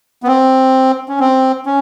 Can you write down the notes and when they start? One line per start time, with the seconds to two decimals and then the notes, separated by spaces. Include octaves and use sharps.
0.23 B3
0.27 C4
1.09 C#4
1.20 C4
1.66 C#4